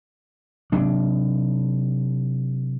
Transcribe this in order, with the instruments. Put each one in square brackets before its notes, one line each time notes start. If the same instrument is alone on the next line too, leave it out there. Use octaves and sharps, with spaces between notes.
[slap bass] C3 F#3 D4